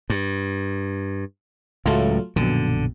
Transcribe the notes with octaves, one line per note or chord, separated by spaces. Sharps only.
G2
C#2 A2 F#3 A3 F4
A#1 F#2 B2 D3